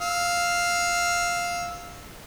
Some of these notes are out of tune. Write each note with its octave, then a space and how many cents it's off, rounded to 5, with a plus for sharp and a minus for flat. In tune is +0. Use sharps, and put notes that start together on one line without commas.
F5 +0 E6 -10